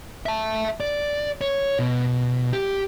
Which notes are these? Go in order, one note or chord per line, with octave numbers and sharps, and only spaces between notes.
E5 A5
D5
C#5
B2
G4